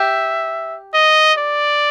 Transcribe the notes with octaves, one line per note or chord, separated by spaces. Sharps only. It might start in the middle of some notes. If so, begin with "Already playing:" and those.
Already playing: G4 E5
D#5
D5